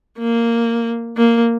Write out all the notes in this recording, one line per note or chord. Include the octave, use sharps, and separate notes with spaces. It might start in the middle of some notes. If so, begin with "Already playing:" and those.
A#3
A#3